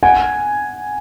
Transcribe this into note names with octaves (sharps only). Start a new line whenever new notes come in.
F#5 G#5